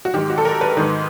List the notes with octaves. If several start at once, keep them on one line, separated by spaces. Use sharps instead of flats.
F#4
G#2 D#3 G4
F#4
A4
A#4
B4
G#2 D#3 B4